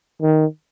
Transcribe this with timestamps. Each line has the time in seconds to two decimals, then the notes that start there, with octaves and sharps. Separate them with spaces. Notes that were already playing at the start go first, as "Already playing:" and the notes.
0.22 D#3